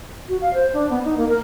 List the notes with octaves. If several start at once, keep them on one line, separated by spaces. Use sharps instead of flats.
F#4
F5
C5
D4
B3
D#4
A#3
A#4